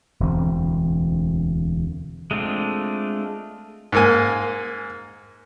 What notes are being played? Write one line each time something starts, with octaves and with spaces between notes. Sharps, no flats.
E1 D2 E3 C4
G#3 A3 C4 D4 F4
G#2 A#3 G#5